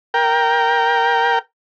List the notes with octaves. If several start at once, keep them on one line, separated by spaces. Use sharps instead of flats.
A#4 G5